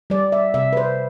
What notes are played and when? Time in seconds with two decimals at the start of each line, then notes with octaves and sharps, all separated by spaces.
0.10 G3 D5
0.32 E5
0.54 C3 E5
0.73 B4
0.77 C5